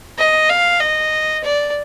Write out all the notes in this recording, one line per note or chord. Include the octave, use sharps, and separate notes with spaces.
D#5
F5
D#5
D5